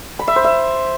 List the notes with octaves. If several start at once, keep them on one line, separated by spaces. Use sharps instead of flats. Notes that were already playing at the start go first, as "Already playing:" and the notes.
B5
E5
C5
E5